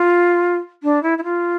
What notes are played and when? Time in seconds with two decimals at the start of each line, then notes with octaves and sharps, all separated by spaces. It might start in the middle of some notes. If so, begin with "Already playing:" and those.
Already playing: F4
0.83 D4
1.03 E4
1.18 E4
1.24 F4